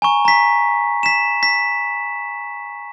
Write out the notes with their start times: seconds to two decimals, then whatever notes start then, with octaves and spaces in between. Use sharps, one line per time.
0.02 G#5 A#5 C#6
0.25 A#5 B6
1.03 B6 E7
1.43 B6